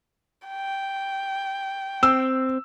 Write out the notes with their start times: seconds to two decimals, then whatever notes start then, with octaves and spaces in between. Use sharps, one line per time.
0.47 G5
2.03 C4 E6